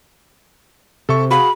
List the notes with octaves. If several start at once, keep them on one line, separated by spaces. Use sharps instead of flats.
C3 A4 E5 C#6
F#4 G#4 F5 B5